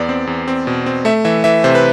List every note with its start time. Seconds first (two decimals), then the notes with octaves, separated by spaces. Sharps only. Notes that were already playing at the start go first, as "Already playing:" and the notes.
Already playing: E2 B3 D5
0.09 C4
0.27 E2
0.48 C4
0.67 B2
0.86 C4
1.05 A3 E5
1.25 E3 E5
1.44 E3 E5
1.64 C3 C5
1.75 B4